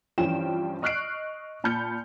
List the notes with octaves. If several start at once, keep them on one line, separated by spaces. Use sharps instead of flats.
G2 E3 F3 C#4 G5 E7
D#5 C#6 F6 F#6 C7 D7
A#2 A5 B5 F6 G6 C#7